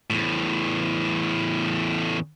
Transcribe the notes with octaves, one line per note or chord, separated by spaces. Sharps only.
E2 A2